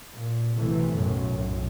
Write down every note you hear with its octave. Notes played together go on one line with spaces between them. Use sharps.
A#2
B1 C3 E3 A3
B1 F#2 A2
B1 F#2 A2